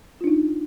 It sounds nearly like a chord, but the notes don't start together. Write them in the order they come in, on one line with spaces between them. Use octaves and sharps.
F4 D4 D#4